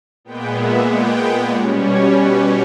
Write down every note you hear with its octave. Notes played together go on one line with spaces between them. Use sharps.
A#2 G#3 B3 G5
E5
G5
B2 G3 C#4
C#5
B4